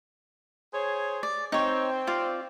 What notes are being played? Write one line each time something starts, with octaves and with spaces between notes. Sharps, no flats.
G#4 C5 C#5
D5
C4 D#4 C#5
F4 D5